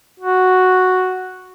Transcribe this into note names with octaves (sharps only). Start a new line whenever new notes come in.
F#4